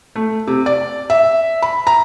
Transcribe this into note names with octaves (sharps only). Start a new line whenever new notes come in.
A3
C3
D5
E5
B5
A#5